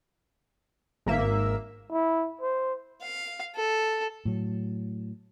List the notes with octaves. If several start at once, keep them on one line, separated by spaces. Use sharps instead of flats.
G#1 A#3 E5
E4
C5
F5
A4
A2 F#3